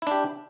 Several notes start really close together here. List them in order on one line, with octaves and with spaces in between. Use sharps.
E4 D4 G4